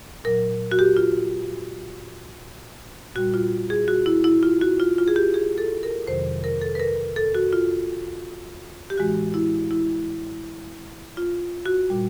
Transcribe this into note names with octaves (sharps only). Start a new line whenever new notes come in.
A#2 F#3 A#4
F#4
G4
F4
A#2 G3 F#4
F4
G#4
F#4
E4
E4
F4
F#4
F4
F4
G#4
G4
G#4
A4
A#4
F2 C3 D#3 F#3 C5
A#4
A4
B4
A#4
A4
F#4
F4
G4
A2 E3 G#3 F#4
E4
E4
F4
F#4
A#2 G3